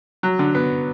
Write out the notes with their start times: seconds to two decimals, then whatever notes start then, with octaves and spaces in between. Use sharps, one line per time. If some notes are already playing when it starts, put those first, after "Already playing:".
0.23 F#3
0.39 D3
0.55 B3